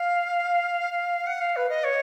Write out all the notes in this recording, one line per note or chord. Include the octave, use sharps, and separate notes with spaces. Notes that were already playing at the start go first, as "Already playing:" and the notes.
Already playing: F5
F#5
F5
B4
D#5
C#5